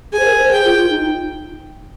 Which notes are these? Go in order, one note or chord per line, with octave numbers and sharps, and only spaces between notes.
G#4 G#5
C5
A#4
C5
G#4 G5
F4
F4
D#4